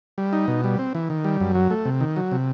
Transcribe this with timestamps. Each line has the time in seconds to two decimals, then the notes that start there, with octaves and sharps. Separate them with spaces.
0.18 G3
0.33 D#4
0.48 B2
0.64 G3
0.79 C4
0.95 E3
1.10 D#3
1.24 G3
1.40 F#2
1.55 F#3
1.70 A3
1.85 C3
2.01 D#3
2.16 F#3
2.31 C3